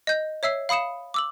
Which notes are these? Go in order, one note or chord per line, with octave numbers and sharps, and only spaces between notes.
D#5 G6
C#5 E5 E6 C7
F5 B5 D#6 C#7 E7
D6 E6 F#7